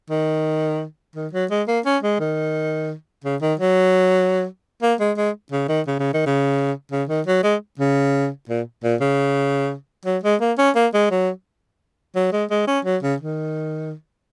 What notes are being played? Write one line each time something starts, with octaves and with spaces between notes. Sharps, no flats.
D#3
D#3
F#3
G#3
A#3
C#4
G#3
D#3
C#3
D#3
F#3
A#3
G#3
G#3
C#3
D#3
C#3
C#3
D#3
C#3
C#3
D#3
F#3
G#3
C#3
A#2
A#2
C#3
F#3
G#3
A#3
C#4
A#3
G#3
F#3
F#3
G#3
G#3
C#4
F#3
C#3
D#3